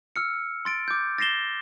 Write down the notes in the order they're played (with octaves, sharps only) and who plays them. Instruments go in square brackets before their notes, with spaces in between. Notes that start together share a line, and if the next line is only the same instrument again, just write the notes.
[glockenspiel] E6 F6 C#7
C6 A6 D7
D6 G6
A6 A#6 C7 E7 G7